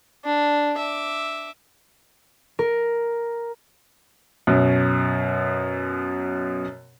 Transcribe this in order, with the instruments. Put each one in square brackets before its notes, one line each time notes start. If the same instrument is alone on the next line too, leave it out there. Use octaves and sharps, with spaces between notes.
[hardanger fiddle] D4
E5 D6
[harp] A#4
[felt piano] F#2 B2